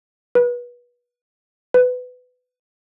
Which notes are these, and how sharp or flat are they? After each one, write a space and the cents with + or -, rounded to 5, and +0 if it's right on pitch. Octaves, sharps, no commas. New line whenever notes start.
B4 -25
B4 +20